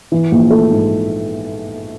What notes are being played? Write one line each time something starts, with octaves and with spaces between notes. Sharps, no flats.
E3
A#1
A3
G#2